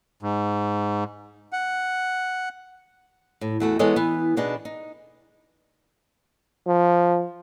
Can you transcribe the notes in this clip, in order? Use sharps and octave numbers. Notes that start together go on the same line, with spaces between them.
G#2
F#5
A2
E2 A3 F#4
E3 G#3 B3 A4 C#5 D#5
E3 B3
B2 D4 D#4 G#4 B4
D#4
F3